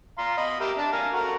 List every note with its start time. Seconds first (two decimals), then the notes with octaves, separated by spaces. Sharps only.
0.18 F5 A#5 C6
0.37 D#5 B5
0.60 G4 A#4 E5
0.78 D4 A5
0.92 A#4 F5 G#5
1.13 F#4 A4 A#4